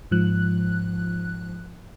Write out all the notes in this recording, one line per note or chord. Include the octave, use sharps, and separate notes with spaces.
G#2 F3 F#6